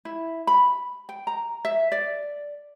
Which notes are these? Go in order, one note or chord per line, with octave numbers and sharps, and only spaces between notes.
E4
B5
G5
A#5
E5
D5